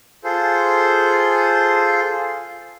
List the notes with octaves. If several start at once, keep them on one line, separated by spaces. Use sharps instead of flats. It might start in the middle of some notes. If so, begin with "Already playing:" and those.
F4 G#4 A4 C5